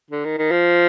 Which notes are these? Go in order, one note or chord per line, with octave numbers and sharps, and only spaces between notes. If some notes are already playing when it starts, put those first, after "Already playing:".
D3
D#3
D#3
F3